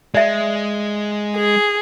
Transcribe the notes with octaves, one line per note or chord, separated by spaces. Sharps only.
G#3 D5 E5
G#4